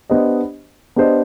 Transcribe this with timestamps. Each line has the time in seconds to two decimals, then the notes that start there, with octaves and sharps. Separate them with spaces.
0.10 B3 D4 G4 C5 D#5
0.96 B3 D4 G4 C5 D#5